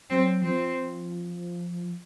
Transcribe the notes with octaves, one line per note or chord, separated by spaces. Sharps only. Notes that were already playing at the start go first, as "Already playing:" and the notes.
F#3 C4
F3 C4